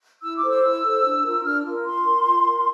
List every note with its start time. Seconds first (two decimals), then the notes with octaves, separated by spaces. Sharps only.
0.23 E4 E6
0.37 D6
0.43 A4 C5
0.50 E6
0.63 E4 E6
0.83 A4 C5
1.04 D4
1.24 F4 A#4
1.44 D4 F6
1.64 F4 A#4
1.84 F4 C6
2.05 A#4
2.25 F4
2.45 A#4